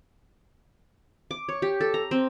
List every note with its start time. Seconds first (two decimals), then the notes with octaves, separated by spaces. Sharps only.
1.31 D6
1.49 C#5
1.62 G4
1.81 A4
1.94 A#5
2.11 C4